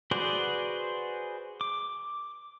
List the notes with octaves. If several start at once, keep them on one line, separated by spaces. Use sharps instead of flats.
F#4 G#4 B4 C5 D5
D6